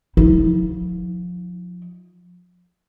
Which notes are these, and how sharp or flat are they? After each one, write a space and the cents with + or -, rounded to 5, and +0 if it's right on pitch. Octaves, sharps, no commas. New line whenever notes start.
F3 +30 E4 -40